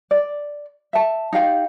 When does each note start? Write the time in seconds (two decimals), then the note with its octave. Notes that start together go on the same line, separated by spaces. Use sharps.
0.11 D5
0.93 E5 A5
1.33 D#4 G4 F5 G5